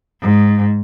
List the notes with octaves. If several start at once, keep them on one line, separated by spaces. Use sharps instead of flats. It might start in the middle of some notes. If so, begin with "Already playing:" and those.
G#2